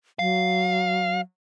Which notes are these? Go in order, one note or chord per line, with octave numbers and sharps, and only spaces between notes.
F#3 F5